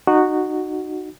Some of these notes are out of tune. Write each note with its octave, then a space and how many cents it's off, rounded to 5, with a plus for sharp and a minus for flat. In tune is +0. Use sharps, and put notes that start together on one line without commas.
D#4 -25 F#4 +0